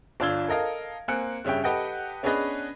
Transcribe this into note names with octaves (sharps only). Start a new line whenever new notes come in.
G1 D4 F4 E6 G#6 G7
A4 A#4 D#5 F5
A#3 C4 G#5 F#6 C#7
G2 C#3 C#4 E5 G5
G4 A4 B4 D#5 F#5 G5
B3 C#4 D4 G#4 B4 D#5